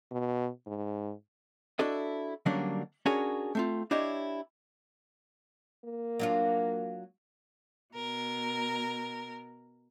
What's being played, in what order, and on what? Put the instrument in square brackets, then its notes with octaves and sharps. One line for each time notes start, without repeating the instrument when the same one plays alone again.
[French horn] B2
G#2
[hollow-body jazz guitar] D4 E4 F#4 A4 D#5
D3 F#3 G3 A#3 C#4 D4
C#4 D4 F#4 G#4 A#4 C#5
A3 C4 F4
D4 E4 G4 C#5 D#5
[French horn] A#3
[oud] F#3 D4 F4
[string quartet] B2 A#4